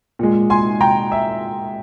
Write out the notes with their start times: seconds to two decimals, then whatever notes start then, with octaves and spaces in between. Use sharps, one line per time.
0.19 A#2 G#3
0.50 G#5 C6
0.81 G5 A#5
1.12 E5